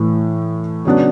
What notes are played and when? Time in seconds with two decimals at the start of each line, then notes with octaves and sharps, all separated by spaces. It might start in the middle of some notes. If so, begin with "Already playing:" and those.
Already playing: A2 E3 A3
0.85 C#3 F#3 B3 D4